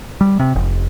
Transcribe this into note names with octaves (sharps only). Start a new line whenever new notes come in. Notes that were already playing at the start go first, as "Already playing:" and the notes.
G3
C3
F1